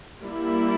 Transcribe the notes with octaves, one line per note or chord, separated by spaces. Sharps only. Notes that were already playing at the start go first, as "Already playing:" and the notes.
G3 A#3 E4